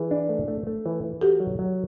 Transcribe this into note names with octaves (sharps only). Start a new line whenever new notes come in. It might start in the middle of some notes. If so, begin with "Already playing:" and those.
Already playing: E3 G#4
D4
A3
A3
A3
E3
E3
F#4 G4 A4
F#3
F#3